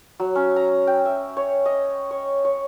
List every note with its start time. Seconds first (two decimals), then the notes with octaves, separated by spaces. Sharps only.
0.20 F#3
0.35 C#4
0.56 A#5
0.87 G5
1.05 E5
1.37 C#5
1.66 D#5
2.11 C#5
2.45 C#5